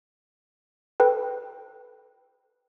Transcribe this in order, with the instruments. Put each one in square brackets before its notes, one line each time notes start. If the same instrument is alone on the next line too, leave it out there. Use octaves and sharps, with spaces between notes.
[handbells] A4 B4 G5